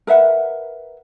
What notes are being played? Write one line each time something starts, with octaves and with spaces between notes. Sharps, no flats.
A#4 B4 E5 F#5